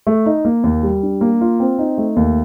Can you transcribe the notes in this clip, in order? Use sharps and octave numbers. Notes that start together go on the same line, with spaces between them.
A3
D#4
A#3
D#2
G3
D4
A#3
F4
C4
D#4
A3
D#2